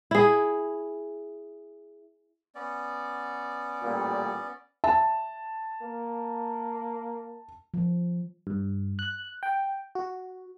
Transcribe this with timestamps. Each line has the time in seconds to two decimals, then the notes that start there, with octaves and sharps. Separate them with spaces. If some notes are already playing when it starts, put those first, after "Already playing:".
0.11 E4 G#4
2.55 B3 C#4 D5
3.83 A1 A#2 G3
4.84 E5 A5
5.82 A#3
7.74 F3
8.47 G2
8.99 F#6
9.43 G5
9.95 F#4